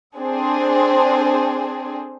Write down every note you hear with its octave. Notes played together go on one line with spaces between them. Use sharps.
C4 D4 G#4 A4 C5